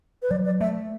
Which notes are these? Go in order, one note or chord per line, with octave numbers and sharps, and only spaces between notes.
B4
F#3 D5
D5
A3 E5